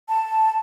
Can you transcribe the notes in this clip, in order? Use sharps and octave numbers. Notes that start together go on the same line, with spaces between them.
A5